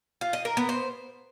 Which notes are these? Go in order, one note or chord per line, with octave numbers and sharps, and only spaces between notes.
F4
D#5
A#4
B3
C5